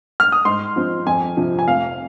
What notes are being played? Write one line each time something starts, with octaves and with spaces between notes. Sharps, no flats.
F6
D#6
G#2 C6
F3 C4
F2 G#5
C3 F3
G#5
F1 F5